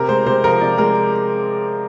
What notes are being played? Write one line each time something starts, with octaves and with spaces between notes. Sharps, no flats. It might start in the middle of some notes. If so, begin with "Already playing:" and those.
Already playing: C3 A#4
G#3 C5
C3 C5
F3 A#4
C3 D5
G#3 A#4